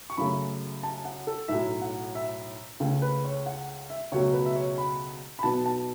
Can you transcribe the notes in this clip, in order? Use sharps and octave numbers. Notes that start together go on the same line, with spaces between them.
C#6
F#2 C#3 A3 B5
A5
F#5
A4
B1 A2 F#3 E5
F#5
E5
C#2 C#3 A3
B4
C#5
F#5
E5
C#2 B2 F#3 A3 C#5
B4
E5
C#5
B5
B5
B1 B2 B3 A5
A5